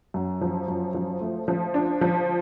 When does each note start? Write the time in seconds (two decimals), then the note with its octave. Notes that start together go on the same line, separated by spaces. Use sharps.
0.14 F#2
0.41 F3
0.68 F#2
0.94 F3
1.21 A3
1.48 F3
1.74 D4
2.01 F3